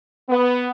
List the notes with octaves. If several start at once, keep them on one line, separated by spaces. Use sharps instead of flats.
B3